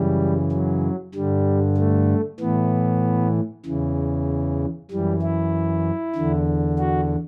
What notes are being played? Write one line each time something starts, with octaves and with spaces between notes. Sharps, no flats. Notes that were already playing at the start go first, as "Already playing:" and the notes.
Already playing: F#2 C#3 E3 G3
F#3
G2 D3 G3
A3
A2 E3 B3
E2 C#3 E3
F#2 E3 G3
E4
E2 D3
F#4